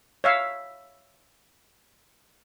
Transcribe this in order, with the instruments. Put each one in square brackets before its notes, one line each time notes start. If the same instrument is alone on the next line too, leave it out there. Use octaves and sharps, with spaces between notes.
[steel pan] C#5 E5 F5